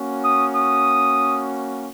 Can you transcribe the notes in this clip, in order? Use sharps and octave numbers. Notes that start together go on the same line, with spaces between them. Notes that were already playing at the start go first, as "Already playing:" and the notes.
Already playing: A#3 C#4 F#4
D#6
D#6